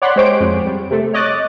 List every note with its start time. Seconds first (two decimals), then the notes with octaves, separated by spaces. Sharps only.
0.02 C#5 D5 F#5 B5 C6 F#6
0.16 G#3 G4 C5 C#5 D7
0.40 F2 G#3
0.66 G3
0.91 C3 A3
1.14 C#5 D#5 D6 F#6 A6